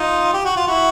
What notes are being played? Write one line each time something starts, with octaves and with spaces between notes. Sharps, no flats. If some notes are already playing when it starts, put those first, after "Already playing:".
Already playing: D#4 F4
G4
F#4
F4
E4 F#4